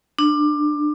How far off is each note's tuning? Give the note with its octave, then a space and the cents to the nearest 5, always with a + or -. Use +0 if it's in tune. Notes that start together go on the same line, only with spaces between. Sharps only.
D4 +20